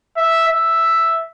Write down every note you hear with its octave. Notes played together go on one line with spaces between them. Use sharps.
E5
E5